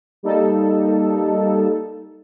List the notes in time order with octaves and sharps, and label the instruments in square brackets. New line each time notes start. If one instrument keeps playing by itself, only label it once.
[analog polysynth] G3 A#3 D#4 A4